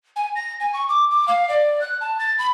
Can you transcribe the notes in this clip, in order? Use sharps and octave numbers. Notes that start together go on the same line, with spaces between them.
G#5
A#6
G#5
C#6
D6
D6
F5
D5
F#6
A5
A6
B5